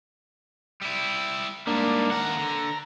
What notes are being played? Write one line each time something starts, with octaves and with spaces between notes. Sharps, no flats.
G3 E4
G#2 G3 A#3 D4
D#2 F#5 A#5
D3